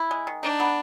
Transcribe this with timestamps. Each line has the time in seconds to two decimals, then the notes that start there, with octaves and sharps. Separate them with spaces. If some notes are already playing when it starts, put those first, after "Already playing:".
Already playing: E4
0.11 G#3
0.27 D#3
0.43 D4 D#4
0.60 B3